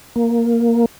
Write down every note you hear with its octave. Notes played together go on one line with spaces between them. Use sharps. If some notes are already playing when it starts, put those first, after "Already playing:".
A#3